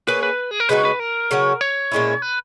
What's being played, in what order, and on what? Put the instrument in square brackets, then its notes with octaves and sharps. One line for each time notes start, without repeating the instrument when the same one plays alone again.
[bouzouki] A#3 C#4 G#4 [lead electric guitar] B4
[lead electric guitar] B4
G#4
A#4
[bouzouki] C#3 G#3 D#4 F#4 [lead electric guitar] B4
[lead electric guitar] B4
A#4
[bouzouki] C#3 F#3 C#4 F#4
[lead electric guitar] C#5
[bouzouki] A#2 G#3 C#4 E4
[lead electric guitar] B4